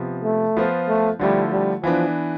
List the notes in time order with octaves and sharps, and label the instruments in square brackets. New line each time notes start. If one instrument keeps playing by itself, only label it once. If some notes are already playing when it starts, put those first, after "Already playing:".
Already playing: [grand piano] C3 F3 B3
[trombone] A3
[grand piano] F3 B3 F4 C5
[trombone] A3
[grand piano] D3 F3 A3 E4 [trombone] G3
[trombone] G3
[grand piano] E3 B3 D4 [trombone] F3